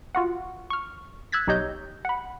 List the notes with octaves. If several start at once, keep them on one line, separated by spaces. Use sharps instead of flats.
F4 F#4 F#5
C#6 F6
E6 F#6 G#6 A6 B6
B1 D#4 G4 C#5 D#5 G6
F#5 B5